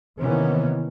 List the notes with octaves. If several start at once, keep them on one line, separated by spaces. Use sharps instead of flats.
C3 D#3 E3 A#3 B3 C#4